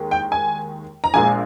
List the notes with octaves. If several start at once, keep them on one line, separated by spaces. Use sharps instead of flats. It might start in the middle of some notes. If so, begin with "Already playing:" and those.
Already playing: D#2 D#3 G#3
G5
G#5
A#5
A#1 A#2 G#3 G#5